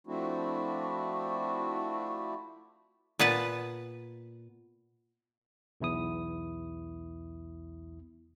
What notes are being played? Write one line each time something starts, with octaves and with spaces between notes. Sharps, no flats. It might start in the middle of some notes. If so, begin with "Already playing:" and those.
F3 A3 C4 D4 E4 F#4
A#2 B3 B4 A5
B1 E2 E4 D#6